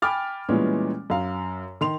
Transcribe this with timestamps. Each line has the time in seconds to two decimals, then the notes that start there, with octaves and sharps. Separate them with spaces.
0.02 G5 G#5 B5 D6 F6 A6
0.48 A#2 E3 G3 G#3 B3 C#4
1.10 F#2 F5
1.81 D#3 C6 F7